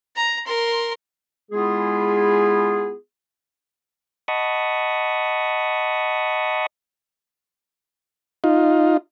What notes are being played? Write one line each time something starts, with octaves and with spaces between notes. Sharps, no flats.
A#5
A#4 C6
G#3 B3 E4 F4 G#4
D#5 F#5 A5 B5 C#6 D#6
D#4 F4